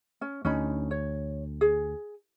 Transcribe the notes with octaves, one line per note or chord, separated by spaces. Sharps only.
C#4
D2 C#4 D#4 B5
C#5
G#4